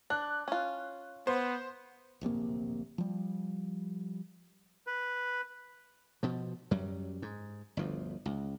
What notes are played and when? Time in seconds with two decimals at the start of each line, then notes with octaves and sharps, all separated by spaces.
0.10 D4 F#6
0.48 C#4 F4
1.27 B3 C5
2.21 D1 A#1 C3 A#3
2.98 F3 G3
4.87 B4
6.23 B2 F3
6.71 F#2 F#3 G3
7.22 G#2
7.77 G1 D2 F3
8.26 C#2